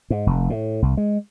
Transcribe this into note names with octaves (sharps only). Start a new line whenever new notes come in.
G#2
F1
A2
C2
G#3